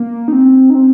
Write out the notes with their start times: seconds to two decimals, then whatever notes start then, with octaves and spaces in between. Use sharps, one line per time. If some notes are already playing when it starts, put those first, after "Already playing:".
Already playing: A#3
0.28 D#4
0.33 C4
0.70 D#4
0.75 C4